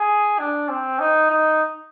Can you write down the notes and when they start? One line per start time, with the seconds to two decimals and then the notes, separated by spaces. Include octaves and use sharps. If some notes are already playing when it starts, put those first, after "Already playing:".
Already playing: G#4
0.39 D4
0.69 C4
0.99 D#4
1.30 D#4